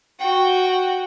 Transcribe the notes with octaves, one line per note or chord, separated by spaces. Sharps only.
F#4 G5